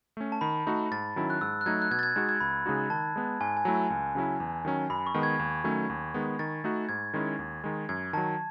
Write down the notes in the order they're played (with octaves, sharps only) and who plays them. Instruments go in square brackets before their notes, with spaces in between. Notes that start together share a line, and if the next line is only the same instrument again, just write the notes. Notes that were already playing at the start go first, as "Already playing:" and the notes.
[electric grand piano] A3 C#4
[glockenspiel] A5
[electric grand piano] D#3 [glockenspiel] B5
[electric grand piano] A3 D#4 F#4
[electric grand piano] G#2 [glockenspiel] A6
[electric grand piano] D#3 F#3 C#4 E4
[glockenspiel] F#6
[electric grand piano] G#2 [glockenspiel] E6
[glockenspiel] F#6
[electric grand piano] F#3 A3 D#4 [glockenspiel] G#6
[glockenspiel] F#6
[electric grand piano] B2 [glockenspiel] G#6
[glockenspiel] A6
G#6
[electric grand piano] G#3 D#4 F#4 [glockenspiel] G#6
[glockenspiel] G#6
[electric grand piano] C#2 [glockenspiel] B5
[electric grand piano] C#3 G#3 D#4 F#4
[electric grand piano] D#3 [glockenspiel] A5
[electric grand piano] G#3 B3
[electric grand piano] G#2 [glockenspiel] G#5
[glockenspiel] G#5
[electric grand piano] F#3 A3 E4
C#2
C#3 F#3 C#4 E4
E2
D#3 F#3 C#4
[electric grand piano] F#2 [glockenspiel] B5
[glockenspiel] C#6
[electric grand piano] D#3 G#3 B3
[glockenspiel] G#6
[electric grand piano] D#2
D#3 F#3 A3 C#4
D#2
D#3 G#3 B3
[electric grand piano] D#3 [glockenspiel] A6
[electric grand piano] A3 D#4 F#4
[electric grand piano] G#2 [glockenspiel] G#6
[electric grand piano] D#3 G#3 C#4 E4
D#2
D#3 G#3
[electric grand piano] F#2 [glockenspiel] G#6
[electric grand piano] D#3 F#3 [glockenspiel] A5